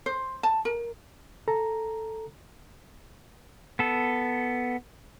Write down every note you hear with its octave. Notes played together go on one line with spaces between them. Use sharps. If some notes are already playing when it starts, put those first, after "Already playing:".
C5
A5
A#4
A4 A#5
B3 A4